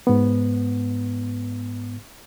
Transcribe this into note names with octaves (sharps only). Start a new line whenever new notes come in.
G#2 B3